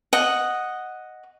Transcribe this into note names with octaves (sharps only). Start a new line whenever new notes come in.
D#5 F#5